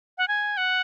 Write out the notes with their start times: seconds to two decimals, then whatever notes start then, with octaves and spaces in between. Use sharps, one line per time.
0.18 F#5
0.28 G#5
0.57 F#5